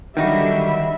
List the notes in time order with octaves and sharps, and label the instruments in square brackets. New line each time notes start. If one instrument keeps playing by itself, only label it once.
[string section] D3 F#3 G3 [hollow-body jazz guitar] D#3 D#4 F#4 [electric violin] E5 B5